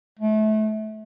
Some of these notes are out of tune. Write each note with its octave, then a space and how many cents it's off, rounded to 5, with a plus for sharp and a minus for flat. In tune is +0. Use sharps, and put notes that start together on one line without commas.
A3 -30